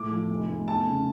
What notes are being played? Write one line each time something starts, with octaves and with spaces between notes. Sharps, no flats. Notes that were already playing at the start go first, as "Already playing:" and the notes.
Already playing: A2 D6
F3
F1
F1
E2 A5
C#3